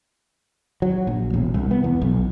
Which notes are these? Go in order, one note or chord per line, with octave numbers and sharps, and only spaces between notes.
F#3
A#1
E1
C2
B3
E2
B1